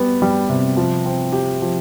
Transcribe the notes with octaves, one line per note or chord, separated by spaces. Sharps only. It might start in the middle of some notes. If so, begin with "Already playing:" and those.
Already playing: G3 B3
G3
C3
F3
C4
G4
F3